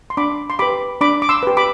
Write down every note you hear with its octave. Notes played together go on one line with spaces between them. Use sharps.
C6
D4 B5 D6
C6
G4 B4 B5 D6
D4 B5 D6
D6
C6 E6
G4 B4
B5 D6